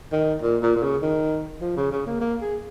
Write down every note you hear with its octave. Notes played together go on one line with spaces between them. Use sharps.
D#3
A#2
A#2
A#2
C#3
D#3
F3
C#3
C#3
A#3
A#3
G#4